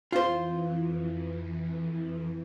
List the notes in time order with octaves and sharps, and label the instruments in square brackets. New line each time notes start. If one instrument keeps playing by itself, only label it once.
[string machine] F2 E3 [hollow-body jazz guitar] F4 C5